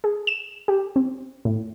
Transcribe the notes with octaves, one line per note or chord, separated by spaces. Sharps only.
G#4
E7
G4
C4
A2